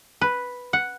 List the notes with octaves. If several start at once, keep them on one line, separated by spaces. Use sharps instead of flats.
B4
F#5